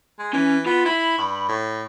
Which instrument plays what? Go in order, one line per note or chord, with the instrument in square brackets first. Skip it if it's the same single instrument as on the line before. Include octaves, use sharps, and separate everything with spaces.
[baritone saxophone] G#3
[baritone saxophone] E3 [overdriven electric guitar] C#4
[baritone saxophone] B3 [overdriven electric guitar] F4
[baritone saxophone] E4 [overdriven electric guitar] B5
[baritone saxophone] G2
A2